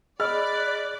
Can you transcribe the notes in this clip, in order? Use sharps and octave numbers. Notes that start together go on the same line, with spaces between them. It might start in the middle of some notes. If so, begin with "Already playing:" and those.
G#4 D5 D#5 B5 F6 F#6 A6